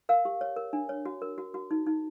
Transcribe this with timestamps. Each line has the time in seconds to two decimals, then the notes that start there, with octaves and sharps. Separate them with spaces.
0.09 A#4 F5
0.25 G4
0.41 C#5
0.56 A#4
0.73 D4
0.89 C#5
1.06 F#4
1.22 A#4
1.38 F#4
1.54 F#4
1.71 D#4
1.87 D#4